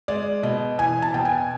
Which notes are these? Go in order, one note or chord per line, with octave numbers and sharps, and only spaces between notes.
G#3 D5
B2 D#5
E2 G#5
A5
B2 G5
G#5